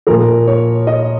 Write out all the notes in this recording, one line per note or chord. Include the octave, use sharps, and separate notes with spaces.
A#2 F3 A#4
C#5
D#5